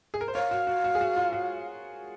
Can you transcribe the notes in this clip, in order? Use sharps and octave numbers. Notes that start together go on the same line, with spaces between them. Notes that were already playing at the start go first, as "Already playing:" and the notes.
G#4
A#4
C5
A#4 C#5 F5
F#4
F#4
F#4
G#4
F#4
F4
F#4